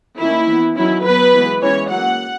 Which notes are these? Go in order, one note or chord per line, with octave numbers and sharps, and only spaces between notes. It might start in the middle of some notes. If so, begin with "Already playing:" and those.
D#3 A#3 C#4 E4
E3 B3
D#3 F#3 C#4 E4
F#3 B3 B4
E3 G#3 B3
E3 G#3 C#4 C#5
F#3 A#3 C#4 F#5